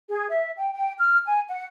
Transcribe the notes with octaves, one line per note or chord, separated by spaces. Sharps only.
G#4
E5
G5
G5
F6
G#5
F#5